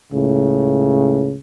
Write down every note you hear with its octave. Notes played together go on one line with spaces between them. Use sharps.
C#2 A2 C#3